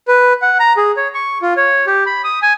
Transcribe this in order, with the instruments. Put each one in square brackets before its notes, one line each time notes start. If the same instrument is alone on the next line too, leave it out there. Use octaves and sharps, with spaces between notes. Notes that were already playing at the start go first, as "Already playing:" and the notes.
[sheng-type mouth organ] B4
F#5
A#5
G#4
C#5
C#6
F4
C#5
G4
B5
D#6
G#5